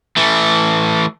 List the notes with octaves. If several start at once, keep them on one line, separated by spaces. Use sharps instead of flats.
E3 A3